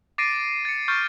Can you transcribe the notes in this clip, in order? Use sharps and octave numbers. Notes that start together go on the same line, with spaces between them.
D6 A6 A#6 C7 D7 D#7
A6 C#7
C#6 F6 G6 A6